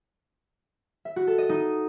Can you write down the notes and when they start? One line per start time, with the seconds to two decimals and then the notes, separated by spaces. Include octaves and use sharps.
1.05 E5
1.16 F#4
1.27 A4
1.38 D#5
1.49 D#4